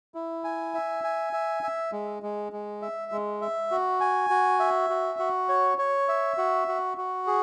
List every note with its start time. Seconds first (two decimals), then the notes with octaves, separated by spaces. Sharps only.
0.14 E4
0.44 G#5
0.74 E5
1.04 G#5
1.33 E5
1.63 E5
1.92 G#3
2.23 G#3
2.52 G#3
2.82 E5
3.12 G#3
3.41 E5
3.71 F#4
4.01 G#5
4.30 F#4
4.60 E5
4.90 F#4
5.19 F#4
5.49 C#5
5.78 C#5
6.08 E5
6.38 F#4
6.68 F#4
6.98 F#4
7.27 G#4